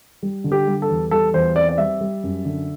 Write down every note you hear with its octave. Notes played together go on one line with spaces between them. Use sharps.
G3
D3
G4
G3
A4
E2
G3 A4
E2 C5
C4 D5
D5
G3 E5
G3
F#2
D3